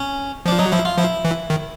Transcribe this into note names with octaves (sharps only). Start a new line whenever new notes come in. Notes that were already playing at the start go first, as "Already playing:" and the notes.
Already playing: C#4
F3 D4
F#3 D#4
F3 E4
F4
F3 E4
E3
D#3